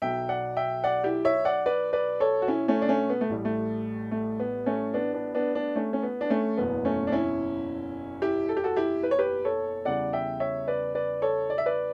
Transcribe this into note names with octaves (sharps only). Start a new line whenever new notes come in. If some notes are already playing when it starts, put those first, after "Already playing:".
B1 B2 F#3 E5 G5
D5 F#5
E5 G5
D5 F#5
E4 G4
C#5 E5
D5 F#5
B4 D5
B4 D5
A4 C#5
F#4
C#4 E4
A3 C#4
D4
A3 C#4
B3
A3
A1 A2 G3
A3
A3
B3
A3 C#4
B3 D4
B3 D4
B3 D4
B3 D4
A3 C#4
C#4
B3
D4
A3 C#4
F#1 E2 B2 B3
A3 C#4
D4
C#4 E4
E4 G4
A4
G4
F#4 A4
E4 G4
B4
C#5
G4 B4
A4 C#5
E2 C#3 G3 D5 F#5
E5 G5
C#5 E5
B4 D5
B4 D5
A4 C#5
D5
E5
B4 D5